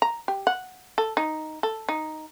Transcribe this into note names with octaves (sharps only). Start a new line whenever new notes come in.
A#5
G4
F#5
A4
D#4
A4
D#4